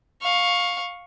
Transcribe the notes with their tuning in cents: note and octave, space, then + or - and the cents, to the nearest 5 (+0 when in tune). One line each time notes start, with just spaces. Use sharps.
F5 +15 C#6 -5